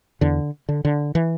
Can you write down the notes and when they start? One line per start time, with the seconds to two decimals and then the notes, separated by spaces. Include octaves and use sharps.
0.21 E2 D3
0.69 D3
0.85 D3
1.15 E3